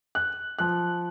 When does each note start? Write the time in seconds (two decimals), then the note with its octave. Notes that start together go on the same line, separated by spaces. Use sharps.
0.15 F#6
0.59 F3 F#6